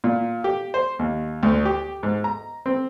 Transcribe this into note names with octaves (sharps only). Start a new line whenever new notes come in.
A#2
G4
C5
D#2
D2
G4
G#2
A#5
C4